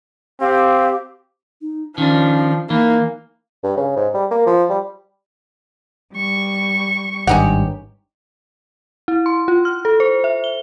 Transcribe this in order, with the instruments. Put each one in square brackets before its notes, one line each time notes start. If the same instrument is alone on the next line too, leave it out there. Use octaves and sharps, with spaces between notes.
[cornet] C4 [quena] G4 [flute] F5
[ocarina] D#4
[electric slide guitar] D#3 D4 [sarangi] F3 [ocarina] C#4
[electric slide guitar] E3 [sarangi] A#3 [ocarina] D#4
[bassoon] G2
C#3
G#2
G3
A#3
F3
G3
[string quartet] G3 C#6
[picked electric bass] G#1 G2 [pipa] C#4 D#4 G4 [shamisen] F#5
[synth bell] E4
C6
F4
F6
A4
C5
E5
G7